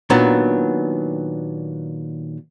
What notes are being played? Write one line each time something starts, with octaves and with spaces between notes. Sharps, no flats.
A#2 D#3 F#3 B3 D4